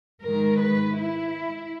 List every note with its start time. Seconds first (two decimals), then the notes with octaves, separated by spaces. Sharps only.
0.25 G#2 D#3 G#3 A#4
0.61 B4
0.97 E4